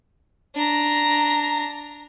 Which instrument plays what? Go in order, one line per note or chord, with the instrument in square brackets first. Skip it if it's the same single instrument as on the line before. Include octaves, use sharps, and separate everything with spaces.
[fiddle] D4 A#5